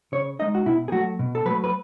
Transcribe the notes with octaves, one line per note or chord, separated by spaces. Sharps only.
C#3 C#5
G#3 D#4 D#5
F#4
B2 E4
G#4
F#3 A3 F#4
B2
A4
F#3 A3 B4
B4